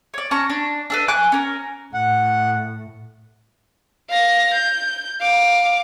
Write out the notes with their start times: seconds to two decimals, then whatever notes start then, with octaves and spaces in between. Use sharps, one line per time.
0.14 C#5 D5
0.31 C#4 A5 A#5 C#6
0.50 D4
0.90 D4 A4 B4
1.08 G#5 C#6 D6 F#6
1.32 C#4 A#4
1.94 A2 F#5
4.10 F5 A#6
4.54 G6
5.21 F5 D6